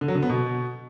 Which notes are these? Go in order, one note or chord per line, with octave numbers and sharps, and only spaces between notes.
D3
F#3
D3
B3
B2